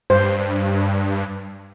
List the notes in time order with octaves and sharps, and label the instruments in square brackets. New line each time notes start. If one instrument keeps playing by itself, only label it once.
[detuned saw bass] G2 [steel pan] C5